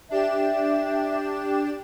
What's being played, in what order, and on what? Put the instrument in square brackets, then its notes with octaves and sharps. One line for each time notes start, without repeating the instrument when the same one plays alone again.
[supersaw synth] D4 G4 E7 [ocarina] E5